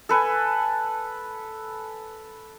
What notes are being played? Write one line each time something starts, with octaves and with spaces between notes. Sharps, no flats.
A4 B4 G#5